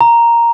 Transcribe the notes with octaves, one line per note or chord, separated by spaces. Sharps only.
A#5